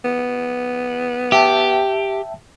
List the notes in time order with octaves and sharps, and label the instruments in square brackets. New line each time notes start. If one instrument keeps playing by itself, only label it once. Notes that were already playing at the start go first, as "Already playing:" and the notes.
[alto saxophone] B3
[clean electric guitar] G4 [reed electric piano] E5 G5 A5